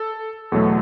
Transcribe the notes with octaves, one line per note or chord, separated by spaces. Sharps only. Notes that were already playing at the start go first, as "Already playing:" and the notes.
Already playing: A4
E2 B2 F#3 A3 A4